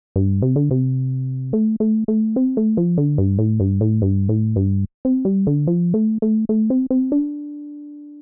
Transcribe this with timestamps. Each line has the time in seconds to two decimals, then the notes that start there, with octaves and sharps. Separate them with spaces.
0.16 G2
0.42 C3
0.56 D3
0.71 C3
1.53 A3
1.80 A3
2.08 A3
2.36 C4
2.57 A3
2.77 F3
2.98 D3
3.18 G2
3.39 A2
3.60 G2
3.81 A2
4.02 G2
4.29 A2
4.56 G2
5.05 C4
5.25 G3
5.47 D3
5.67 F3
5.94 A3
6.22 A3
6.49 A3
6.70 C4
6.90 C4
7.12 D4